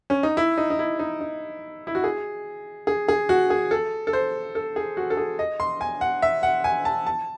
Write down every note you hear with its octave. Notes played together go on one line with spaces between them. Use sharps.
C#4
D#4
E4
D#4
D#4
E4
D#4
D#4
E4
F#4
G#4
G#4
G#4
F#4
G#4
A4
A4
C5
A4
G#4
F#4
A4
G#4
D#5
C6
G#5
F#5
E5
F#5
G#5
A5
A5